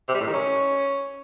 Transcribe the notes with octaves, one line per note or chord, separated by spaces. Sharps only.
C3
G3
A2
D#3
C#4